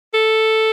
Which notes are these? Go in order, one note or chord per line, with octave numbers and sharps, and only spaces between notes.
A4